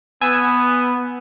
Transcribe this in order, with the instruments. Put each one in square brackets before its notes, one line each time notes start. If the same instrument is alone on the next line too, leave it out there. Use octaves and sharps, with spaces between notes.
[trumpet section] B3 [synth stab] G#5 E6